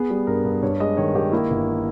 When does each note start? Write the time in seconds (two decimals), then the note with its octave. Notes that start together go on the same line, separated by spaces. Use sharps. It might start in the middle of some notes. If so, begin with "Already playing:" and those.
Already playing: B3 G#4
0.10 G3
0.27 G2 A#4
0.45 G2
0.62 G2 C#5
0.80 G#3 D#5
0.97 D#3 C#5
1.15 D#3 G4
1.32 A#3 E4
1.50 G1